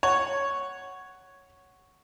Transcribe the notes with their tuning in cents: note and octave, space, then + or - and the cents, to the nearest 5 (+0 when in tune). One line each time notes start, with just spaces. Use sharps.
C#5 +0 F#5 +5